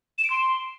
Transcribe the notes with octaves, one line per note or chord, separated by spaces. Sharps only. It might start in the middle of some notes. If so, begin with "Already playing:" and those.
E7
D7
C6